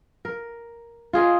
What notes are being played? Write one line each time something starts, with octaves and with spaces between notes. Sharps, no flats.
A#4
F4 G#4 D#5